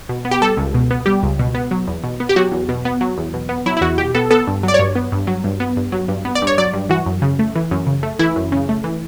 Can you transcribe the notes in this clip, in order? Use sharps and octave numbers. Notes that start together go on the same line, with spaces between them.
B2
B3
G4
G3 A4
C#2
B2
B3
G3 G4
C#2
B2
B3
F#3
E2
B2
B3
G4
F#3 F#4
E2
B2
B3
F#3
E2
B2
B3
F#3 E4
E4
E2 F#4
B2 G4
B3 A4
B3 A4
G2
F#3 D5
C#5
G2
B3
G2
F#3
G2
B3
G2
F#3
G2
B3
D5
G2
C#5
F#3 D5
G2
E3 F#4
F#2
C#3
A3
E3
F#2
C#3
A3
E3 E4
F#2
C#3
A3
E3